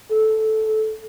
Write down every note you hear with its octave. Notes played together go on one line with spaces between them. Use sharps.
A4